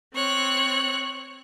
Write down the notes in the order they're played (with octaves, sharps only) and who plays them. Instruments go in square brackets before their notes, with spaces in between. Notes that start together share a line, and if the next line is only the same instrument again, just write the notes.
[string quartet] C4 C#5 F#6